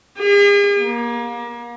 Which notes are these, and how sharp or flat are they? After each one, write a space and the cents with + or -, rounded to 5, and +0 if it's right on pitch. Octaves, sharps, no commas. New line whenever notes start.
G#4 -45
A#3 +30